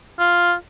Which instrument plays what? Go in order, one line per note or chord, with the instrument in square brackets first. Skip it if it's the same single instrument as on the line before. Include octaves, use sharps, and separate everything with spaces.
[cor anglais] F4